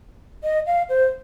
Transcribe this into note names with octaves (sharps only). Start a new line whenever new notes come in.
D#5
F5
C5